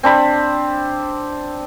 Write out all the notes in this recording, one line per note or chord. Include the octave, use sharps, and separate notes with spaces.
C4 D4 B5